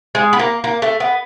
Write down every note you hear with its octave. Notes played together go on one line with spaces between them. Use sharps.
G#3
B3
A#3
A#3
A3
B3